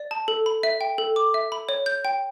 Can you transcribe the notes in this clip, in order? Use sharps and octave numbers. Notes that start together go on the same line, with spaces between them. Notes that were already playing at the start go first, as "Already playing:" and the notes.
Already playing: D5
A5
A4
B5
E5
G5
A4
D6
E5
B5
C#5
G6
G5